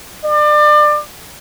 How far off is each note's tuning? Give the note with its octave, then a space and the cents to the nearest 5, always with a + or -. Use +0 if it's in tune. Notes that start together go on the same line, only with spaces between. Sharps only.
D5 +30